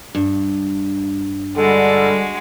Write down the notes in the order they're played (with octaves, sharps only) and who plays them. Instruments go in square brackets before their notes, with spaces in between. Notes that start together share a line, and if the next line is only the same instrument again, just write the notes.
[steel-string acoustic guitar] G2
[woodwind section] D3 G3 [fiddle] G#3 F#4 [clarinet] A4